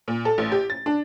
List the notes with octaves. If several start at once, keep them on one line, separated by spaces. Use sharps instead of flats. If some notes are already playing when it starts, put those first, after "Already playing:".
A#2
A4
A1
G4
A6
D4